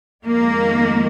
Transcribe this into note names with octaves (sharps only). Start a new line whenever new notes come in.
F2 D#3 G#3 A#3